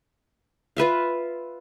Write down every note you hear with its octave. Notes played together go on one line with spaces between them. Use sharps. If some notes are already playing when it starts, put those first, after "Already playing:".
F4 B4 E5 F5